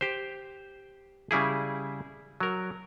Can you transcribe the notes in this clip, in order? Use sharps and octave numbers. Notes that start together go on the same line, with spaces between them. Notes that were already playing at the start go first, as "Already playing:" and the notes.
G4 C5
C#3 G3 E4 G#4
F#3 A#4